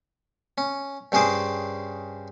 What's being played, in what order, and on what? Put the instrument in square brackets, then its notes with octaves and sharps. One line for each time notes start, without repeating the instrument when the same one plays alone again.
[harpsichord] C#4
G2 C#3 C#4 G#4 C5 D6